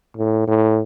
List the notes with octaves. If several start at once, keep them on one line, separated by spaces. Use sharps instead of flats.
A2
A2